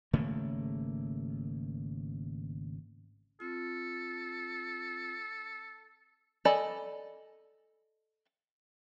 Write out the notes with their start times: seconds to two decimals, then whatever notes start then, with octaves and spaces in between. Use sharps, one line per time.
0.13 G#1 C#3 A3 A#3
3.40 C4 F4 A4
6.45 A4 D5 D#5 G#5 B5